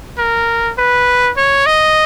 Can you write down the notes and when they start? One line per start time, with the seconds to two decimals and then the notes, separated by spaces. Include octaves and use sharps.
0.18 A#4
0.78 B4
1.37 C#5
1.66 D#5